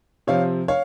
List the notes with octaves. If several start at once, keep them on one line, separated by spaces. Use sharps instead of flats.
C3 F3 C4 C#5 F5
C#5 F5